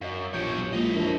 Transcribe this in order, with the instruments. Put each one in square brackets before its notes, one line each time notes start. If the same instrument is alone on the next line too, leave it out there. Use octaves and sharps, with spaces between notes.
[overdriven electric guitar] F#2 [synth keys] D#5 F5
[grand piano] A#1 G4 D7 [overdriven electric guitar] B2 C#5 [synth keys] G6
[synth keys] F#3
[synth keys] G#3 A#3 F4 [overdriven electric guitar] E4 D#5
[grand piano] F#2 F3 [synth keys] D4 A#4